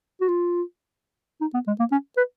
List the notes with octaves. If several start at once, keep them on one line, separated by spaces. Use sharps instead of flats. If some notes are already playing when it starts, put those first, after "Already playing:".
F#4
F4
D#4
B3
G#3
A#3
C#4
B4